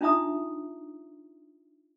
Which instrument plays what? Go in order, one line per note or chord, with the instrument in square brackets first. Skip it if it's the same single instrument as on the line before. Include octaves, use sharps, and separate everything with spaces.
[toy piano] D4 D#4 F4 E5 A#5 D#6